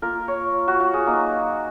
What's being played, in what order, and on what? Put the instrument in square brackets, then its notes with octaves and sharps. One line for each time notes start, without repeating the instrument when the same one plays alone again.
[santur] A#3 F4 A#4
C#5
F#4
F#4
G#4
F#3 A#3 D#4